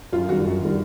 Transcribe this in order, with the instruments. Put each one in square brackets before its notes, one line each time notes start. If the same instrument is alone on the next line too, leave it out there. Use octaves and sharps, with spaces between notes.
[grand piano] F#2 [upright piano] F4
[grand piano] D#3 G3 [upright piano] F#4
[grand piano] F#2
D#3 G3